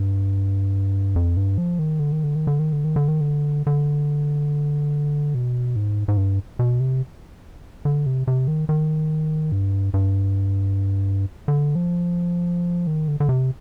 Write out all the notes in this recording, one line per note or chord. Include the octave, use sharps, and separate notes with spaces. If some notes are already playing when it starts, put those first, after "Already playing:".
Already playing: G2
F2
G2
F3
D#3
D3
D#3
D3
D#3
D3
D#3
D3
D#3
D3
D#3
D3
D3
B2
G#2
G#2
G2
B2
C3
D3
C3
C3
D#3
D#3
G2
G2
D3
F3
D#3
D3
D3
C3